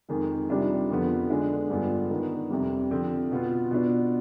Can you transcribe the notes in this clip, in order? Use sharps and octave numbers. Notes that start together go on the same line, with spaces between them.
F2 D#3 G#3
C3 D#3 G3 D4 F4
F2 D3 F3 B3
D3 G#3 D4
G2 D3 G#3 B3 F4
D#3 B3 D4
F2 C3 G3
D3 F3 C4 F4
B2 B3 F4
B2 B3 D4 F4